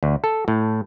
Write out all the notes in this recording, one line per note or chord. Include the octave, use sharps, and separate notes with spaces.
D2
A4
A2